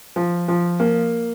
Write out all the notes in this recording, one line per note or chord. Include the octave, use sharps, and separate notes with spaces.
F3
F3
A#3